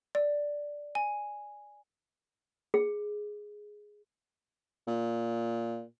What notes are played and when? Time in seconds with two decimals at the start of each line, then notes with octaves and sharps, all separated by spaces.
0.15 D5
0.95 G#5
2.74 G#4
4.87 A#2